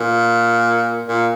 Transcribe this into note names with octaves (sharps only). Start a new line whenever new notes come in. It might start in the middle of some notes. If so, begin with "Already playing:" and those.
Already playing: A#2
A#2